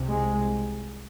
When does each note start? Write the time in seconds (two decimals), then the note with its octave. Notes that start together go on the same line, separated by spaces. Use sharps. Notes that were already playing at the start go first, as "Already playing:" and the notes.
Already playing: C2 C3
0.08 G#3